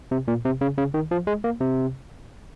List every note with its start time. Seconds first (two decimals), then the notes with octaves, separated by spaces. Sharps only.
0.11 C3
0.28 A#2
0.45 C3
0.61 C#3
0.78 C#3
0.94 D#3
1.11 F3
1.27 G#3
1.44 A#3
1.61 C3